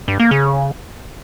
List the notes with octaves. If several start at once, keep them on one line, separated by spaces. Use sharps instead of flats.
G2
A#3
C#3